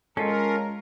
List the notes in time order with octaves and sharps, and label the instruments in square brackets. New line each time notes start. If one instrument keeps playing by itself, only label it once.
[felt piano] G#3 [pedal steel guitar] C#4 F4 [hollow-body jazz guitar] A4 [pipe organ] A#4